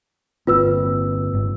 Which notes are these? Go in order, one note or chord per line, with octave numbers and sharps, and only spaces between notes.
G1 A#3 C4 F4 B4 E6
G1 G#2